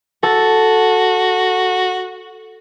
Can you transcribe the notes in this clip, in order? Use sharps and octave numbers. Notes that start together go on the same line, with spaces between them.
F#4 A4 A5 A6